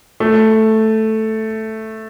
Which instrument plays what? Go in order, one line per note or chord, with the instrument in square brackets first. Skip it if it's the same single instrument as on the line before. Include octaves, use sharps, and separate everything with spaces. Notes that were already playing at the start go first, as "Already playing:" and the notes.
[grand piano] A3